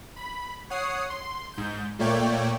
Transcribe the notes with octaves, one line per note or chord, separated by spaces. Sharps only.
B5
C#5 F#5 D#6 C7
C6
G#2 G6
A#2 A3 A#3 C#5 D5 G5